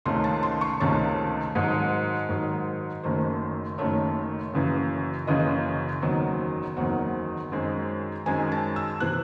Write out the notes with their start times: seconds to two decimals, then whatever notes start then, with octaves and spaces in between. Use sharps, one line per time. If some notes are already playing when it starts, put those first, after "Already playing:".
0.05 C#2 C3 D#3 A3 C#4 C6
0.24 A5
0.43 C6
0.61 C#6
0.80 C#2 C3 D#3 A3 C#4 A5
1.55 G#2 D#3 F#3
2.29 G#2 D#3 F#3
3.04 F#1 F#2 D#3 A3 C5
3.78 F#1 F#2 D#3 A3 C#5
4.53 F#1 F#2 C#3 E3
5.27 F#1 F#2 C#3 E3 D#5
6.02 F#1 E2 D#3 F#3 C4
6.77 F#1 E2 D#3 F#3 C4 F#5
7.52 F#2 D#3 G#3 C4
8.26 F#2 D#3 G#3 C4 G#5
8.52 A5
8.76 E6
9.00 C3 E3 C4 F#6